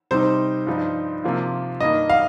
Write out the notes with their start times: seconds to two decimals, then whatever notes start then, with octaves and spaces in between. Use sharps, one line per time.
0.11 C3 G3 D#4 C5
0.66 G2 F3 D#4
1.24 C3 F3 A#3 F4
1.80 G2 D#3 A#3 D#5
2.10 F5